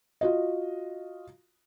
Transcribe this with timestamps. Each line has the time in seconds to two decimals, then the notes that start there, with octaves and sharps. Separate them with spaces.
0.21 F4 F#4 D#5